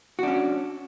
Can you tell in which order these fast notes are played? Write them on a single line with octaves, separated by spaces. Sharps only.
F#4 D4 C#4